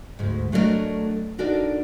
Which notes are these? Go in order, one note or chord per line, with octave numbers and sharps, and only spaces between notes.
D2 G#2
F#3 A3 D4 F4 A#4 D#5
D4 D#4 F#4 A4 A#4 D5